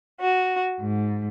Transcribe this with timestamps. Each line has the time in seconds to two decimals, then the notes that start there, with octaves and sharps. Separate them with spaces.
0.21 F#4
0.80 G#2